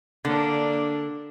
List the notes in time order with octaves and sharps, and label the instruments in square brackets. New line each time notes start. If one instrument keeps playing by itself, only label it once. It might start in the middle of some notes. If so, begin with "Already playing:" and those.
[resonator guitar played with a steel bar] D3 [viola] A#3 D4